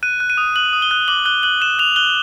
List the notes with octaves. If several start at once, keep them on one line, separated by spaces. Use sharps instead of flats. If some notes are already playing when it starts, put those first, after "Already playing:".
F#6 D#7
F#6
D#7
D#6
F#6 F#7
D#6
G7
F#6
D6 F#7
F#6 G7
F#6 F#7
F#6 E7
F#6 F7
F#6 G7